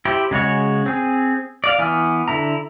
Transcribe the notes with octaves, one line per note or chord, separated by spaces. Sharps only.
E4 G4 C5
C#3 G#3 F#4 C#5
C4 G#4
D5 F5
E3 B3 G#5 F6
D3 E4 A#5